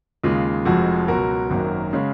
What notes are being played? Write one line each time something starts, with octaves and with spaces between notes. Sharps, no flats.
D#2 C#3 G#3 F4
F1 F2 F3 G#3 F#4
C#2 B2 F#3 F#4 A#4
G#1 F#2 D#3 F#3 A#3
C#3 G#3 C#4